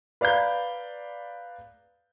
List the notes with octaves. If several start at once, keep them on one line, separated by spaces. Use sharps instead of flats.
B4 D5 F5 A#5 G6